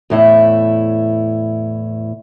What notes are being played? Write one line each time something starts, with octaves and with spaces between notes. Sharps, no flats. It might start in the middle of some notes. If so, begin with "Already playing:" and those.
E2 A2 E4